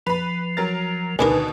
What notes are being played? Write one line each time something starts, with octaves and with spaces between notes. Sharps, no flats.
F3 B4 B5
F#3 A#4 A6
D2 B2 D3 D#3 D4 A#4 B4 G#5